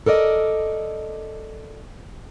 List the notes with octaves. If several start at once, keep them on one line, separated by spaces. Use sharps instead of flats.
A4 A#4 D5 D#5